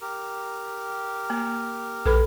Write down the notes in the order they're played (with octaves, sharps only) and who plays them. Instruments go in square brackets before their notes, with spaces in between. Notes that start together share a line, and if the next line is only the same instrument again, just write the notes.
[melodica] G4 A#4
[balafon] A#3
[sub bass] A#1 [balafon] A4 B4 B5